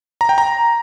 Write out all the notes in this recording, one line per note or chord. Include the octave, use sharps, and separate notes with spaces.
A#5
G5
A#5